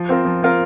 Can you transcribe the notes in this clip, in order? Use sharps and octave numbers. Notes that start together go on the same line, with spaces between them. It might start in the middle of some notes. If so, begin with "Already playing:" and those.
Already playing: F3
C4 F4 A#4
F3
C4 F4 A#4